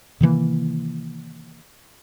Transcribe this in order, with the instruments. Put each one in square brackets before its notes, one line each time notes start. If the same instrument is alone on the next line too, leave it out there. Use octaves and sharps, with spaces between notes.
[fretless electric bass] C3 D#3 E3 A#3